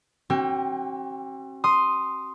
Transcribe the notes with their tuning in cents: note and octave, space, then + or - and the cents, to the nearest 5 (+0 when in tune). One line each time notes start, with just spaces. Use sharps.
C4 +45 F#4 +35 G5 +15
C6 +0 D#6 +0